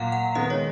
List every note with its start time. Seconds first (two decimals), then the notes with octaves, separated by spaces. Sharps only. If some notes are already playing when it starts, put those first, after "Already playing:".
Already playing: A#2 F#3 F5 F#5
0.12 F#5
0.35 D#3 G#3 B3 D#5
0.50 C#5